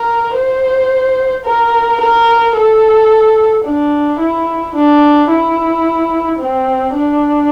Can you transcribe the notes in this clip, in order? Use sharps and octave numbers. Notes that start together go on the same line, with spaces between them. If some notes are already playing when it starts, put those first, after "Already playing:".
Already playing: A#4
C5
A#4
A#4
A4
D4
E4
D4
E4
C4
D4